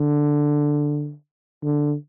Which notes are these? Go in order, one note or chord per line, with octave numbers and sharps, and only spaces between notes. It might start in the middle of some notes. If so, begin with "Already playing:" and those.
Already playing: D3
D3